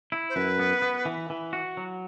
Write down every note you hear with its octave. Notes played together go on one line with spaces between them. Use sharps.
E4
C5
F#2 B4
B3
B3
E3
E3
F#4
F#3